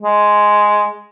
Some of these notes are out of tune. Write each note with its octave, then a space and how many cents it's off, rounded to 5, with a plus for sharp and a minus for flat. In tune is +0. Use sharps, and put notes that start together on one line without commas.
G#3 +5